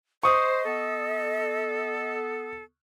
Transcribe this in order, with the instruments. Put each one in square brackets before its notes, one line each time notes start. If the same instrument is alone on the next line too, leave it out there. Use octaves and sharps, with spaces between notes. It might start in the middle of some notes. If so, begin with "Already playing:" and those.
[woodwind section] C5 [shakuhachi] D#5 [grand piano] C#6 D#6
[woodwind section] B3 A4